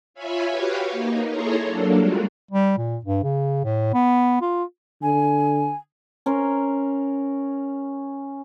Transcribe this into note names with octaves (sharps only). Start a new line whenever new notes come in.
F4 C#5 E5 G#5 B5
F#4 G4 B4 C#5 F5
A#3 D#4
E4 G#4 A4 C#5 A#5 C6
F#3 A#3 D4 A4
G3 G#3 F4 F#4 A#4
G3
A#2
G2
C#3
A2
B3
F4
D3 G#5
C#4 A#4 C6